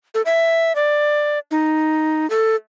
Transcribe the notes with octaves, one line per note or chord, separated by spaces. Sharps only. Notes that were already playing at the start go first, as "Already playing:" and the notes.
A4
E5
D5
D#4
A4